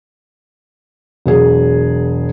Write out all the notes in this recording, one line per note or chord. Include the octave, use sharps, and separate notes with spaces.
E1 F#3 G#4